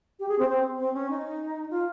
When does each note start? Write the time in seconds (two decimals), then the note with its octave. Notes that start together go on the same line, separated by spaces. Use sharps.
0.20 G4
0.29 G#4
0.39 C4
0.49 C4
0.79 C4
0.94 C#4
1.10 D#4
1.71 F4